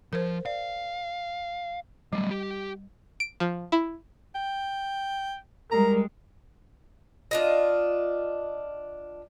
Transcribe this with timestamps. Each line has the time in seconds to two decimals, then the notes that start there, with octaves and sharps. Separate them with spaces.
0.13 F3 A#4 C5
0.46 D5 F5
2.13 F#3 G3 A3
2.31 G4
3.20 D7
3.40 F3
3.72 E4
4.35 G5
5.72 G3 G#3 A#4 A#5
7.31 D4 F4 D#5